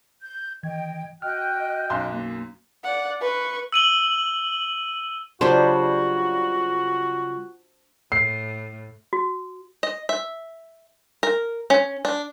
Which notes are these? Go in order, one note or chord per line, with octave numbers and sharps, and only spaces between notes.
G6
D#3 E3 D#5 G5 G#6
F#4 D#5 G5 F6 F#6
B1 F#2 C6
A#3
D5 F#5
B4 C#6
E6 D#7 F#7 G7
C#3 F#3 G3 D4 F4 F#4 C5
A2 C7
F#4
D#5
E5
A#4
C#4
D4